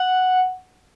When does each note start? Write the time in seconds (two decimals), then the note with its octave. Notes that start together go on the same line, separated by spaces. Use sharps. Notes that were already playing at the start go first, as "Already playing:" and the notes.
Already playing: F#5